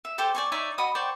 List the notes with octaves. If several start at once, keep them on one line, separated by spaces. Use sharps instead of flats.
E5
G4 A4 C5 A5
D5 G#5 C#6
D#4 C#5 D5 E5
F#4 D#5 B5 D#6
C5 D5 G5 C#6